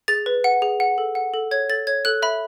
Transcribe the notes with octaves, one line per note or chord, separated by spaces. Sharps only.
G#4 A6
B4
F#5
G#4
F#5
A4
F#5
A4
C#5 G#6
A4 A6
C#5 G#6
A4 F#6
E5 B5